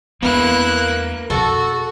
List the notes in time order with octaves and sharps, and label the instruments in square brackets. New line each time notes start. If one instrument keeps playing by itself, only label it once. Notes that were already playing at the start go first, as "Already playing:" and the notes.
[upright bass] E2 B3 [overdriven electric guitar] A#3 B4 [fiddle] E4 F#6
[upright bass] F2 B2 [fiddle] F#4 [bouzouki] A4